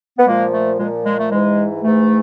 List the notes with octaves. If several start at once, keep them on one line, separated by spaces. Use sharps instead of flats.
B3
A#2 F3 G#3 A#3
A3
A#2 F3 G#3
G#3
A3
G#2 E3 G#3
G#2 E3 A3